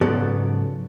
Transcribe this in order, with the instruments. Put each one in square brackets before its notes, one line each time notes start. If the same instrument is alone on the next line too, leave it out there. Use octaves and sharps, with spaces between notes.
[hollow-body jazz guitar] G#2 C#3 F#3 B3 A4 D5